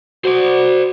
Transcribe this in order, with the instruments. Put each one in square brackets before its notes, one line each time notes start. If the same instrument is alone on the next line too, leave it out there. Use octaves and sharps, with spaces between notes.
[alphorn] F#4 [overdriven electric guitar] C5 D5